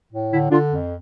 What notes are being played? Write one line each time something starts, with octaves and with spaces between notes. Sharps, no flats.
A2
D3 E4
D3 D4 F4
F2